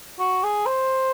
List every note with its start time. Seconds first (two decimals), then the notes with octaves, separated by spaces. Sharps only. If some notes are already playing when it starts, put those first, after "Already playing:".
0.19 F#4
0.43 G#4
0.66 C5